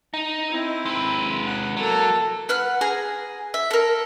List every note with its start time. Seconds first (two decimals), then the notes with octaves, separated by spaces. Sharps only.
0.14 D#4
0.49 C4 E4
0.86 G#3 B4
1.45 G#4 F#5
1.77 F#3 A#3 A4
2.49 B4 F#5 F6
2.81 G#4 G#5 A#5
3.54 E5
3.71 A4 A#4